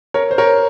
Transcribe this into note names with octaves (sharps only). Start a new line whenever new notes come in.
A#4 C#5
C5
A#4 C#5